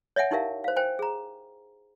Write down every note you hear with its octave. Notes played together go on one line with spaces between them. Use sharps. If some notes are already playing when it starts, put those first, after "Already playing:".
C#5 D#5 E5 F#5 G#5
D#4 E4 G4 A#4 E5 F5
C5 F5
C5 G5 G#5
G#4 A#5